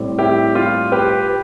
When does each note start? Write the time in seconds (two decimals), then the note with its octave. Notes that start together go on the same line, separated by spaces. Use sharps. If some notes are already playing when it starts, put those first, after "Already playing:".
Already playing: A2 G3 C4
0.18 E4 G4
0.55 F4
0.92 G4 B4